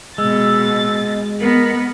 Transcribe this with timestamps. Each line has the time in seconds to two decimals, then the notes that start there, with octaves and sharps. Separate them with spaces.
0.18 B2 G#3 E6 A6
1.40 B3 A#4